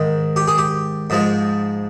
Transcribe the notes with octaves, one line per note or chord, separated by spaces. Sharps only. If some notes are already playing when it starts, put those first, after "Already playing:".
Already playing: G#2 D#3 G#3
G4
G#4
G4
G#2 F3 G#3